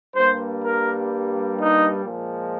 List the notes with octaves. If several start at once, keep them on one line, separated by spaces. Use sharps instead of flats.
G2 G3 A#3 C5
A#4
D#4
A#2 F3 G#3